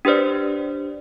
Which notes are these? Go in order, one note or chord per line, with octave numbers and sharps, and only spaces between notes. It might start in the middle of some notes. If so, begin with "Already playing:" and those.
D4 G4 B4 C5 D5